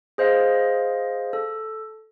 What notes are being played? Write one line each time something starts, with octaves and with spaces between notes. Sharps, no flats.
G#4 C5 D#5 F5
A4